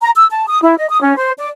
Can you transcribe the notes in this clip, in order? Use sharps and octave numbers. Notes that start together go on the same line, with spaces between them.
A#5
E6
A5
D#6
E4
D#5
D#6
C#4
C5
D5